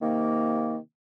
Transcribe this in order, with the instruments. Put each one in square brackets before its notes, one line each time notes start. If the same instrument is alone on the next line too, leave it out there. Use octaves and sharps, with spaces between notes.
[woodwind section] C3 D#3 A#3